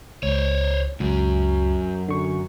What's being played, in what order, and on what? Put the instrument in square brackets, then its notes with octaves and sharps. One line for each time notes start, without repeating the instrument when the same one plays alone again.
[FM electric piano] C#2 [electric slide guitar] C5 C#5
[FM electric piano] C#2 [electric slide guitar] F#2 F#3
[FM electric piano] D3 C#6